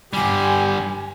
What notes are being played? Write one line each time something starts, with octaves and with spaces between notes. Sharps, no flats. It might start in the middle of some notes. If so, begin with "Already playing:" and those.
G2 D3 G3 G4 G#5